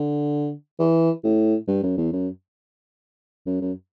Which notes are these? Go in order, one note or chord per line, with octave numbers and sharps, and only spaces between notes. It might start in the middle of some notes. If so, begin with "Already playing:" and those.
Already playing: D3
E3
A2
G2
F#2
E2
F#2
F#2
F#2